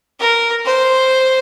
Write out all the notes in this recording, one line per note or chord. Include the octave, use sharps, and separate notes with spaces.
A#4
C5